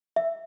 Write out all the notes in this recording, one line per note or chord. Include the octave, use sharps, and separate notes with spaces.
E5